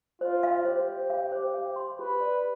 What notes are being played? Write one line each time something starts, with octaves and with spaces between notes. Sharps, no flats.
F4 C5
F5
G4 C5
C5
F5
C5
F5
C6
G4 B4
D5